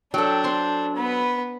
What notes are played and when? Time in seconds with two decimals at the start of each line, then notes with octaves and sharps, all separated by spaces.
0.14 F#3 D4 A4 G5
0.44 C5 C6 C#6
0.97 B3 B4